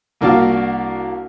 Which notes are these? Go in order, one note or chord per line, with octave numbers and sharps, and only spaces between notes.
C2 A#3 D4 F#4 F5